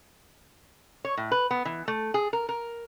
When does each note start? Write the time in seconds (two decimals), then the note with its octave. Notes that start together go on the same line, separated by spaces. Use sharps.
1.05 C#5
1.17 A2
1.32 B4
1.51 B3
1.65 E3
1.88 A3
2.14 G#4
2.33 A#4
2.49 A#4